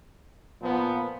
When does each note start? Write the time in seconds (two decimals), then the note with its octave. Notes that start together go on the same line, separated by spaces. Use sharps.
0.60 A#2 F3 B3